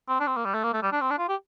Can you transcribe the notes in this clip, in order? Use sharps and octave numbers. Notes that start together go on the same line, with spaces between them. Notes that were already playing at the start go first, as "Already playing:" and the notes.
C4
D4
C4
A#3
G3
A3
A#3
A3
G3
D4
C4
D4
F4
G4